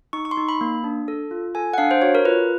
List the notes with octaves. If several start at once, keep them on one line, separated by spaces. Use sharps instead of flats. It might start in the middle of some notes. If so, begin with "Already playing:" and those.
D#4 C#6
C#6
C6
D#4
B5
A#3
D4
A4
F4
A4 G#5
F#5
D4 F5
C5
F#4 C#5
A#4
F4 B4